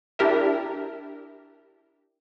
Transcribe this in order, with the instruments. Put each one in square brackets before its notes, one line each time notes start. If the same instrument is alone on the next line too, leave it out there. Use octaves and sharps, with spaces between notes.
[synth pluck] D4 E4 G4 A#4 E5